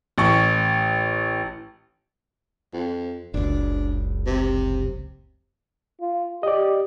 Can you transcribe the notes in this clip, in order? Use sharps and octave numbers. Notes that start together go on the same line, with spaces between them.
A1 C#6
F2
F#1 C#2 D4
C3
F4
G4 D5 D#5